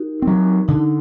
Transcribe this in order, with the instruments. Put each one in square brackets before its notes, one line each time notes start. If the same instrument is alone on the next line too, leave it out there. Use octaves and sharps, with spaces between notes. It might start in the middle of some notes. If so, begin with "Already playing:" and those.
Already playing: [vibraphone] D#4 F#4 G4 A#4
[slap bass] F#3 C4
[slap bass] D3 [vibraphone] D#4